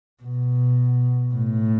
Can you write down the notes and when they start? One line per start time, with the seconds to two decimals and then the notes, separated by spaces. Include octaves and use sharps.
0.23 B2
1.35 A2